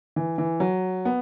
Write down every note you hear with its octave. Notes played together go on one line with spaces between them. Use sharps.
E3
E3
F#3
B3